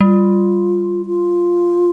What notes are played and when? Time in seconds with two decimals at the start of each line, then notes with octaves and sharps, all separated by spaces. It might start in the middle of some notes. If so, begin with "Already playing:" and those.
0.01 G3 F4
1.06 F4